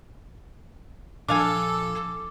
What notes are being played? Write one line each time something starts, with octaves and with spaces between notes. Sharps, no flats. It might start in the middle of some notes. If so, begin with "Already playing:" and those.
A#2 F3 D4 A4 F5 G#5 D6